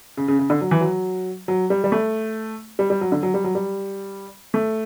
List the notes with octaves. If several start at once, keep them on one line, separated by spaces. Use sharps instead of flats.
C#3
C#3
C#3
D3
F#3
E3
F#3
F#3
G3
G3
A3
G3
G3
F#3
D3
F#3
G3
F#3
G3
A3